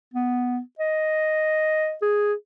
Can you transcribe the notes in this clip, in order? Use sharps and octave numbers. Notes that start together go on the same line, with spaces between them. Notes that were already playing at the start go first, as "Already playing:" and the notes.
B3
D#5
G#4